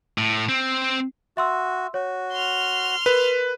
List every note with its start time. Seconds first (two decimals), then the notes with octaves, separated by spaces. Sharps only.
0.18 A2
0.49 C4
1.37 F#4 E5 C6 E6
1.94 F#4 C#5
2.32 C6 F6
3.06 A#4 B4